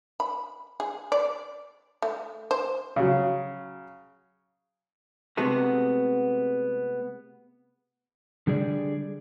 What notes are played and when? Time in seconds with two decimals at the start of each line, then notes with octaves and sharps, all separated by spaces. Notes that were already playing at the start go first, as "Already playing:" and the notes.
0.20 B5
0.80 G#4
1.12 D5
2.02 A3
2.51 C5
2.96 C#3 F#3
5.37 C3 G#3 A3 B3 F#4
8.47 D3 G3 G#4 D5